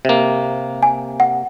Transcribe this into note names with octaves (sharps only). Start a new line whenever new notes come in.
C3 A#3
G#5
F#5